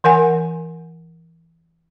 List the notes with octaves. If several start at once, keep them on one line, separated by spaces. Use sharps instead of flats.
E3 A#4 F#5 G#5